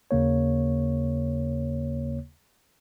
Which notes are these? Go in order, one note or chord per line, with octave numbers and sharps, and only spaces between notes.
D#2 C#3 A#3 C#5